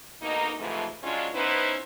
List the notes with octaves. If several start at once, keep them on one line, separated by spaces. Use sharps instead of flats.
D2 B2 A#3 D#4
G#2 C3 E3 F3 A3
F#3 G#3 C#4 D4 F4
B3 C#4 D#4 E4 B4 C5